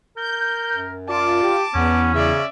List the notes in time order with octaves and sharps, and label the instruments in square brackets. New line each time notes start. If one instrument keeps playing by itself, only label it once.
[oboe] A#4 [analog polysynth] G6
[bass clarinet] F#2
[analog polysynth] F4 [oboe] D5 [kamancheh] A5 D6
[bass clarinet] G4
[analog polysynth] E2 [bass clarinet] B3 [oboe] C#4
[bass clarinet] C#3 [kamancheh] D5 E5